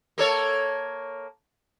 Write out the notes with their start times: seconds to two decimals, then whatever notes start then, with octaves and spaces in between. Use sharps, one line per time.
0.18 A#3 A4 C#5